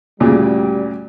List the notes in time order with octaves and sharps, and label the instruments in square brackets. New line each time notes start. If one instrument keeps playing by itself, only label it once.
[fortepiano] D2 A#2 C#3 [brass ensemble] G3